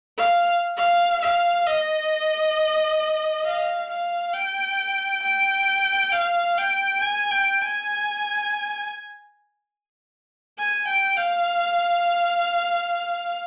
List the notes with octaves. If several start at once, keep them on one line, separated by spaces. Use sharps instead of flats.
F5
F5
F5
D#5
F5
F5
G5
G5
F5
G5
G#5
G5
G#5
G#5
G5
F5